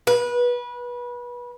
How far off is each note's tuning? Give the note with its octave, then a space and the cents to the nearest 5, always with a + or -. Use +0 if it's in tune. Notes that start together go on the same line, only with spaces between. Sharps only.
B4 -25